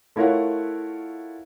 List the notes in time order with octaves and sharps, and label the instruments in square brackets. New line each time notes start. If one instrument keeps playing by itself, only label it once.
[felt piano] A3 E4 F4 A#4 C#5 F#5